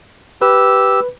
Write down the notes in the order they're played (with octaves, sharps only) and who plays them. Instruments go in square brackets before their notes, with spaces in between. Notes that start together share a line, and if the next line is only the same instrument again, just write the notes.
[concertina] G4 E6 [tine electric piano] B4